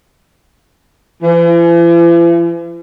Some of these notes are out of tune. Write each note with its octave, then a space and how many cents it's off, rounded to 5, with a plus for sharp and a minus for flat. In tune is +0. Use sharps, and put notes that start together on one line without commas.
E3 +45